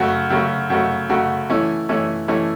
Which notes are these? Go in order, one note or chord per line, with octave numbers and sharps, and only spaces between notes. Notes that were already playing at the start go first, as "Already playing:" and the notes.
Already playing: F#2 C#3 A3 F#4
F#2 C#3 A3 F#4
F#2 C#3 A3 F#4
F#2 C#3 A3 F#4
E3 A3 C#4 E4
E3 A3 C#4 E4
E3 A3 C#4 E4